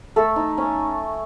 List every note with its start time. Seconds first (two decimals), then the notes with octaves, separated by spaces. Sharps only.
0.16 A3 A4
0.36 D#4
0.58 C#4